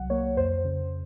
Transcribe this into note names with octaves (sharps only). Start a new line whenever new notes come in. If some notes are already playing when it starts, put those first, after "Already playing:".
Already playing: C2 F#3 F#5
A#3 C#5
F2 C5
C#3